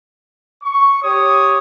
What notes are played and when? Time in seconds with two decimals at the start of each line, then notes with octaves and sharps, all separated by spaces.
0.64 C#6
1.03 G4 C#5 D#6